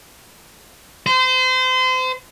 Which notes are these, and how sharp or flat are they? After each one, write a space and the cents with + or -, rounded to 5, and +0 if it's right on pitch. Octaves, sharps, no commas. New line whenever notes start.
C5 -30